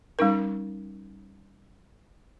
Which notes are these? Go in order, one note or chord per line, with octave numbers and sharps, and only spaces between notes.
G3 C#4 D#4 A#4